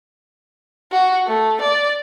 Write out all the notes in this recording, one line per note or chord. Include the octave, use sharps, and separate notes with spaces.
F#4
A3
D5